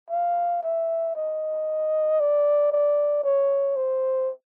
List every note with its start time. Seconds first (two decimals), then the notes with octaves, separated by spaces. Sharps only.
0.10 F5
0.63 E5
1.16 D#5
2.20 D5
2.72 D5
3.23 C#5
3.76 C5